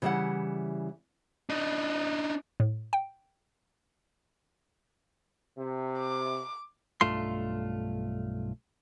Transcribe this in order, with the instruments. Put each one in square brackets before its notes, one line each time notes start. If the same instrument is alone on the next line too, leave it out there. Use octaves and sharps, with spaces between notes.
[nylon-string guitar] C#3 E3 G3 D5 E5 F#5
[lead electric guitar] D4 D#4
[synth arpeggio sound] A2
G5
[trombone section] C3
[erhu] D6
[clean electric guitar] B1 G2 A3 F4 C6